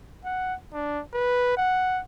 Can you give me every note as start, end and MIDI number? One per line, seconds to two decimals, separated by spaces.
0.25 0.54 78
0.73 1.01 62
1.13 1.53 71
1.57 2.01 78